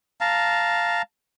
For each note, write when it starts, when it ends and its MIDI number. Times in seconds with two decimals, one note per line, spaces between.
0.21 1.02 77
0.21 1.02 81
0.21 1.02 82